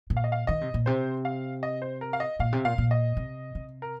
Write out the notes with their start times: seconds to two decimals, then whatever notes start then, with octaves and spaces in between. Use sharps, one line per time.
0.10 A#2
0.17 F5
0.24 D#5
0.32 F5
0.47 D#3 D#5
0.61 C3
0.74 A#2
0.86 C3 C5
1.25 F5
1.63 D#5
1.82 C5
2.01 A#4
2.13 F5
2.20 D#5
2.39 A#2 F5
2.52 C3
2.65 A#2 F5
2.78 A#2
2.91 D#5
3.17 C3
3.55 C3
3.82 A#4